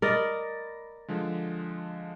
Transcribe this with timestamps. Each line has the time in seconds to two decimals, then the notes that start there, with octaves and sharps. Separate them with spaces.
0.02 A#4 D5 D#5 B5 A6 A#6
1.08 D3 F3 G#3